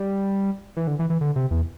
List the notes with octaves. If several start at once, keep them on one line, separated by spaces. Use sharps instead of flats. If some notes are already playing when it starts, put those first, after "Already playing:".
Already playing: G3
E3
D3
E3
E3
D3
C3
E2